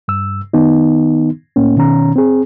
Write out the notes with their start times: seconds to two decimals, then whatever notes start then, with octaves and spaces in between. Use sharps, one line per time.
0.08 G2 E6
0.53 D#3 B3 D#4
1.56 A2 A#3 C#4
1.77 B2 D#3 C#4 A#5
2.16 C4 G#4